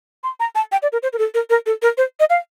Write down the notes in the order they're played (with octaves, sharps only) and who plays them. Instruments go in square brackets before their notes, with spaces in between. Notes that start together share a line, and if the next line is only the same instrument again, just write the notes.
[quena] C6
A#5
A5
G5
D5
A#4
C5
A#4
A4
A#4
A#4
A4
A#4
C5
D#5
F5